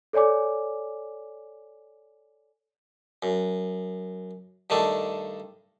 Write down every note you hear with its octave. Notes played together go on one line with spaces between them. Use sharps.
A4 C#5 D5 G#5 D6
F#2
G2 D#3 A3 D4